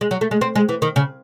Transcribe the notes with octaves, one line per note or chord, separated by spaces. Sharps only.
G#3
F#3
A3
G#3
C4
G#3
E3
D#3
C#3